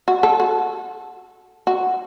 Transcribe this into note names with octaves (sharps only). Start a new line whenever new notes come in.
F#4
A4
F#4
F#4